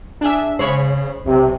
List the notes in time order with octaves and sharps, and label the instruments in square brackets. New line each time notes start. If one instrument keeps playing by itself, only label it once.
[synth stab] D4 G#4 E5
[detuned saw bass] C#3 [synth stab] G#3 C#5 B5 [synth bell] C5
[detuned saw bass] B1 [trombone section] C3